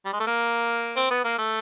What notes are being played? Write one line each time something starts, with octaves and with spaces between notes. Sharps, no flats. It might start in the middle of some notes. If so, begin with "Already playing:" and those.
G3
G#3
A3
A#3
C4
B3
A#3
A3